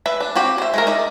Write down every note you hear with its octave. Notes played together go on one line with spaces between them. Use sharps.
B4 E5
D4
C4 F#4 G4
C5 E5
G#3 A3 A#4
D#4 D5 E5